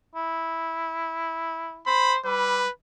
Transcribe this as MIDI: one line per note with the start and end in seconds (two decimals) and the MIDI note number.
0.15 1.81 64
1.87 2.18 72
1.87 2.16 83
2.25 2.62 55
2.25 2.71 71